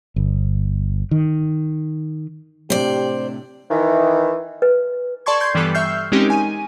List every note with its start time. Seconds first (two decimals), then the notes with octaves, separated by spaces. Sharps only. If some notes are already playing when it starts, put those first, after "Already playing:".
0.16 G1
1.11 D#3
2.70 A2 C3 D4 G4 C5 D5
3.70 D#3 E3
4.62 B4
5.26 A4 D5 A5 C6 C#6 G#6
5.40 C6 G6 G#6 C7
5.54 G2 E3 G3 B3 A4 F#6
5.74 E5 C#6 E6 F6 G6 C7
6.12 G#3 C4 C#4 D#4 G4 A#4
6.30 G#5 D#7